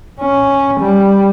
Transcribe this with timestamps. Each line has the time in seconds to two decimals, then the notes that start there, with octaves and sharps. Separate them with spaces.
0.20 C#4
0.80 G3